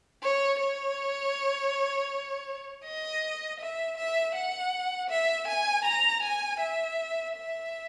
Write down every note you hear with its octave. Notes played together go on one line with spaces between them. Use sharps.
C#5
C#5
D#5
E5
E5
F#5
E5
G#5
A#5
G#5
E5
E5